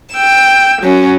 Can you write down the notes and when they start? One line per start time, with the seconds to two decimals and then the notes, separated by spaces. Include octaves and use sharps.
0.13 G5 E6
0.81 F#3 C#4